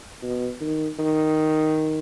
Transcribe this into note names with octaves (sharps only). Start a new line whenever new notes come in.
B2
D#3
D#3